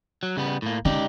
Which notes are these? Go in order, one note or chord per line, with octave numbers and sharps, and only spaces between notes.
F#3
C#3 G3 B3
A2 A#3
C#3 G#3 D#4 G4 D5